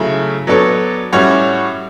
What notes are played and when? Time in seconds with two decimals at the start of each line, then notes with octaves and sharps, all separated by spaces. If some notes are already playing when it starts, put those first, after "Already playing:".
Already playing: C#3 F#3 A3 E4
0.47 F#3 B3 D4 A4 C#5
1.13 A2 G3 C#4 F#4 C#5